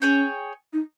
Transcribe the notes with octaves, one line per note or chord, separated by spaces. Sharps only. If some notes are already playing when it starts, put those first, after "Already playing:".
C#4 G#4 C#5 G5
D#4